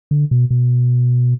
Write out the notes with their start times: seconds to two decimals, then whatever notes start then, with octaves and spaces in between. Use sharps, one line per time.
0.11 D3
0.31 B2
0.51 B2